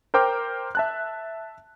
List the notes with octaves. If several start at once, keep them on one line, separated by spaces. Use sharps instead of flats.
A#4 C5 G5 D6 F6
E5 A5 F#6